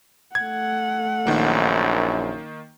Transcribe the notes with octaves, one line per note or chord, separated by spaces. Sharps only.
A3 F#5 G#6
A#1 F#2 D#3 A#3